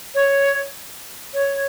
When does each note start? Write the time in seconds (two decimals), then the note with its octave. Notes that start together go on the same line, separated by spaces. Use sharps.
0.15 C#5
1.34 C#5